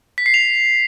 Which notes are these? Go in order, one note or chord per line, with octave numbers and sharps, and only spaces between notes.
B6
C7
F7